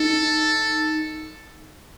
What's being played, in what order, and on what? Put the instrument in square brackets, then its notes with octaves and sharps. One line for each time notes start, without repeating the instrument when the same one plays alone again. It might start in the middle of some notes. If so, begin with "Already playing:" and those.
Already playing: [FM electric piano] D#4 [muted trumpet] A4